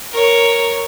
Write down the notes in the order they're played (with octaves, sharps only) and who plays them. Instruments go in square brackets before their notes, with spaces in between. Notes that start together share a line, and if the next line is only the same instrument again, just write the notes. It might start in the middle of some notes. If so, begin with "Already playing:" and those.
[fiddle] A#4 C#5